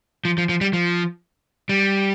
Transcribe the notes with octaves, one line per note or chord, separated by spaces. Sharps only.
F3
F3
F3
G3
F3
G3